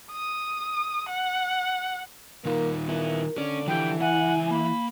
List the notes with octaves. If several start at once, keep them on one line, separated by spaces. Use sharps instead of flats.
D#6
F#5
D#3 A#3 D#4 F4
B3 E4 A#4
D#2 D3 C#4 D5
E3 F3 G4 G5
C#2 E4 F#5 G#5
A#3 B5